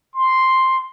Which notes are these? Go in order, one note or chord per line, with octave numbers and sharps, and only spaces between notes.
C6